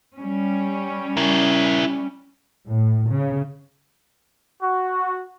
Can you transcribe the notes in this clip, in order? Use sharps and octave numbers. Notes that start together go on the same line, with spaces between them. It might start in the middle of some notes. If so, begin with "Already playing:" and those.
G3 C#4
E4 A#4
A2
C#3
F#4